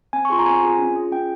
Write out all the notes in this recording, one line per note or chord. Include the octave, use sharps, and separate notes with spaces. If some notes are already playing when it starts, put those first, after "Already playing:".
C4 G#5
C#6
F4 G#4 C6
A#5
C4 G#5
F4 G#4
C#4
F4 G#4
C#4 G5